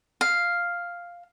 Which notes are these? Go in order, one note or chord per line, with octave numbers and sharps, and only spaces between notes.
F5